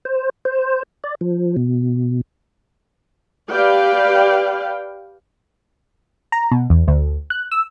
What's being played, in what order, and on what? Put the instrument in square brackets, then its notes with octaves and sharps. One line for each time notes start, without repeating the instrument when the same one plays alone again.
[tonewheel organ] C5
C5
D5
F3
B2
[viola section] G4 B4 D5 F5 G5
[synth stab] A#5
B2
E2
D2
F#6
E6